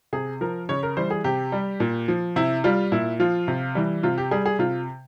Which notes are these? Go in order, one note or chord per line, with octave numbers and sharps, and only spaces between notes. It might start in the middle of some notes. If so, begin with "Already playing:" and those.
C3 G#4
F3 A#4
C#3 C#5
A#4
E3 G3 C5
G#4
C3 G4
G3
A#2
F3
C3 E4
G3 F4
A#2 E4
F3 F4
C3
E3 G3
C3 F4
G4
G3 G#4
G#4
C3 F4